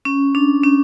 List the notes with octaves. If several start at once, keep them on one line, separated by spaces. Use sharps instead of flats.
C#4
D4
C#4